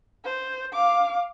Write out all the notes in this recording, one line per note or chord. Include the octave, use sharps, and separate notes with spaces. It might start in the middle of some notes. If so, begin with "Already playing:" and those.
C5
F5 D6